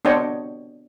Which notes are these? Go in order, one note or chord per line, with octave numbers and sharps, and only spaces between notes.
B3 C4 D4 C#5 D#5 G5